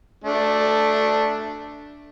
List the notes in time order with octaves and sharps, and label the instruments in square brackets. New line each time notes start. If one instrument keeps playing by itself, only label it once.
[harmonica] A3 D4